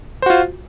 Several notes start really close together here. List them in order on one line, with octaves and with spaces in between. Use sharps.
C5 F#4 F4